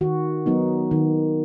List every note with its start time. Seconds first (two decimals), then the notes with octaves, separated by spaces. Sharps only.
0.01 D#3 F#4
0.46 F#3 B3 D#4
0.91 D#3